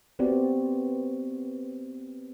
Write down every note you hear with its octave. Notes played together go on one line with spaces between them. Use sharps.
B3 C4 F#4 G4 D5